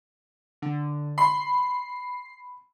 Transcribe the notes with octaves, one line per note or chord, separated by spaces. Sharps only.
D3
B5 C6 C7